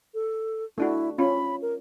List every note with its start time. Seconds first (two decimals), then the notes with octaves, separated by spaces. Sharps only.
0.14 A4
0.78 A3 D4 E4 F#4
1.18 C#4 F4 B5
1.62 A#4